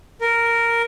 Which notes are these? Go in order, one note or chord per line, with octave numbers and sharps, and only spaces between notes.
A#4